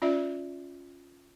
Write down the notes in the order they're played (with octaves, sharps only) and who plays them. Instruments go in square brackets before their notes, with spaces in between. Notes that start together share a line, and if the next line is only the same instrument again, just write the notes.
[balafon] C#4 F4 D5 E5